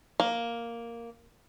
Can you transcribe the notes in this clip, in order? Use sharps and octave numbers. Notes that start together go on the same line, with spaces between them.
A#3